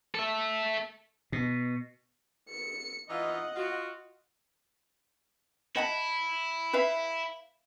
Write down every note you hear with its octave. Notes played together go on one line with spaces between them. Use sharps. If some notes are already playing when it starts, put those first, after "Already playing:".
A4 E5
B2
C#7
E3 D#4 F4 D#5 F#5
F4 F#4
E4 D#5 F#5 A5
B4 E5 F5